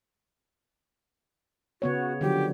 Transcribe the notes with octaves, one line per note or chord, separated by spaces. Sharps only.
C#3 B3 F#4 C#5
D3 F3 F#3 G4